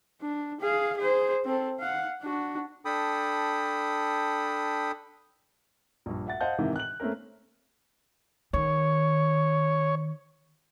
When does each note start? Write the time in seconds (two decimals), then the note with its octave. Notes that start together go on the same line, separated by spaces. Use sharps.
0.21 D4
0.60 G#4 F5
0.97 G#4 C5
1.45 C4 A4
1.80 F5 F#5
2.23 D4 F#4
2.85 D4 A4 G5 B5 D#6
6.06 A#1 G2
6.27 E5 F#5 A6
6.41 C5 D#5 F5 F#5 A5 G6
6.58 G#2 C3 D#3 E3
6.76 F#6 F#7
7.00 A3 A#3 C4 C#4 A#4
8.53 D#3 C#5